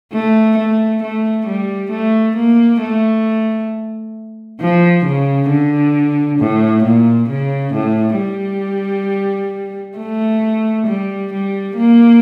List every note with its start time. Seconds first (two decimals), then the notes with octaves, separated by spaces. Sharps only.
0.13 A3
0.58 A3
1.03 A3
1.47 G3
1.91 A3
2.36 A#3
2.82 A3
4.60 F3
5.05 C#3
5.51 D3
6.39 A2
6.84 A#2
7.29 C#3
7.73 A2
8.19 G3
9.98 A3
10.87 G3
11.33 G3
11.76 A#3